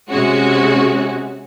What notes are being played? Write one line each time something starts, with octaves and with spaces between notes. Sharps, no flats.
C3 G#3 C#4 F#4